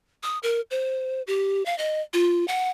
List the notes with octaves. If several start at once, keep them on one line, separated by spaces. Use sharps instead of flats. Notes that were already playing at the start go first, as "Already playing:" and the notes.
D#6
A#4
C5
G4
F5
D#5
F4
F#5